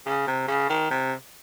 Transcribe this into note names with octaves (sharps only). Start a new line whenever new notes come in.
C#3
C3
C#3
D#3
C3